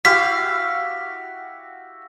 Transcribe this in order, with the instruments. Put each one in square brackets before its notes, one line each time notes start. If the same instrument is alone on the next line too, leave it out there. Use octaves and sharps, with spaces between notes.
[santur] E4 F#4 G4 [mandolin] F5 [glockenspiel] B6